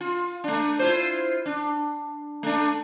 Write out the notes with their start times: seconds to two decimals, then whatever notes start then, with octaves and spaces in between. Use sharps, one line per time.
0.01 F4
0.44 A3 D4
0.79 E4 F4 C5
1.46 D4
2.43 A3 D4